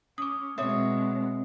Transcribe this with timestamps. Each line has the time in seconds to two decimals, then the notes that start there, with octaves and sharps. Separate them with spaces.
0.18 C#4 D6 D#6
0.58 B2 G#3 C4 C#5 E5 D#6